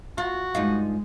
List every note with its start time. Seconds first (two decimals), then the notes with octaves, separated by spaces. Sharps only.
0.18 F4 F#4
0.55 G2 G#3 D#4 F4